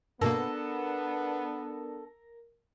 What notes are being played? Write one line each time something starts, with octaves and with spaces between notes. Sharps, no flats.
G2 B2 A#3 B3 D4 A4 A#4